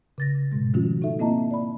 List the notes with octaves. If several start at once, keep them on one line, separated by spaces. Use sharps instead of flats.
C#3 A6 A#6
G#2 B2 G#3
D#3 F3 A3 C#4 F4 F#4
D#4 A4 E5
A#3 C4 E4 D#5 A5 A#5
D5 B5